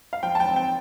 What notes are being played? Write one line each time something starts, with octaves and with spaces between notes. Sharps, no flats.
F5
F3 G5
A5
G5
C4
G5